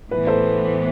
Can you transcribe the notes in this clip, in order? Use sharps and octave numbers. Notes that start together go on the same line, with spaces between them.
A2 E3 B3 B4
A4 C5